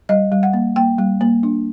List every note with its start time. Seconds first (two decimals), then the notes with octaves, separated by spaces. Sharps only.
0.09 G3 D#5
0.32 G3
0.43 F#5
0.53 A#3
0.76 A#3 G5
0.98 G3
1.21 A#3
1.43 D4